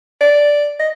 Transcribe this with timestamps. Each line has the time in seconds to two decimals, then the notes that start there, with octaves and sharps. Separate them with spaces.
0.21 D5
0.79 D#5